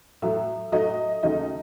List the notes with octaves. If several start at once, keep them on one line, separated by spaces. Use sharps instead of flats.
A2 F#3 A3 E5
A2 F#3 A3 D#5
D#2 C#3 F#3 A3 D#4 D#5